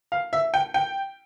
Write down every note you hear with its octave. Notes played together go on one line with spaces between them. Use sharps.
F5
E5
G5
G5